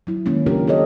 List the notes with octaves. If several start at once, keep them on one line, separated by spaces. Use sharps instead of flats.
F#3 E4
D#3 G#3 A#3 C#4
C#3 F#3 D4 F4 G4 A#4
G4 A4 C#5 D#5